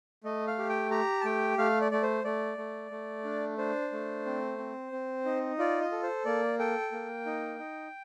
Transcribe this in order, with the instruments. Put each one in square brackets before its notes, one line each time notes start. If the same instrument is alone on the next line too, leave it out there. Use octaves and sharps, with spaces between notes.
[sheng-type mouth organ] A3 D#5
F5
G4
G5
G4 A#5
A5
A3 G5
A3 F5
D5
A3 D5
C5
A3 D5
A3
A3
D4
D4 C5
A3
C4
C4
C4
D#4
F4 D5
D#5
A4
C5
A#3 D5
A4 G5
A#3
D#4
D#4